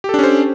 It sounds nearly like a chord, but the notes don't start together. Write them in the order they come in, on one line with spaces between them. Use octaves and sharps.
G4 A4 D4 C#4 C5